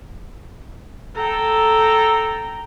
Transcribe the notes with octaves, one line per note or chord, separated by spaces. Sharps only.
A4 G5 A#5